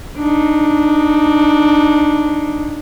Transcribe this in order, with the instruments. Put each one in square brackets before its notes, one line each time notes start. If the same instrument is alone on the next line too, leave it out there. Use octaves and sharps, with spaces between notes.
[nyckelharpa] D4 D#4